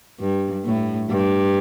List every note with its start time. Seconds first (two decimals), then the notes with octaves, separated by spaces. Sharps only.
0.20 G2
0.65 A2
1.09 G2